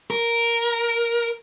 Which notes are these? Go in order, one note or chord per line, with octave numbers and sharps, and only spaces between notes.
A#4